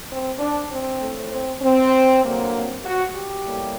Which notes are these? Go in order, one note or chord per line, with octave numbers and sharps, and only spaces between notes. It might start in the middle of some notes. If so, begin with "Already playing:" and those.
C4
D4
C4
A2 A3
C4
C4
G2 D3 F#3 A#3
C4
F#4
G4
A2 G3 A#3